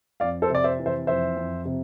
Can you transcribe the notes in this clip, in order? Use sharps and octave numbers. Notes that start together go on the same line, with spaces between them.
F2 D5 F5
A4 C5
C3 D5
C5 E5
E3
C5 E5
F2 C5 E5
F2
C3